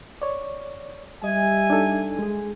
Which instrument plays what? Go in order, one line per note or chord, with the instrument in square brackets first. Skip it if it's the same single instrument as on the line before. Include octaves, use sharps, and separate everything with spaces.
[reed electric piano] C#5 D5
[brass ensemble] G3 E5 G#5 [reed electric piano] D#5
[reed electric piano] D4 D#4 A4
G#3 G#4